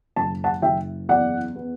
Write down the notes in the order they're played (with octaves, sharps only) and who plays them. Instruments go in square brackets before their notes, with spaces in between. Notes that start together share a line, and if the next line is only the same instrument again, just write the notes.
[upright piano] F#1 A5
F#5 A5
F#1 E5 G5
E2 D5 F#5
B3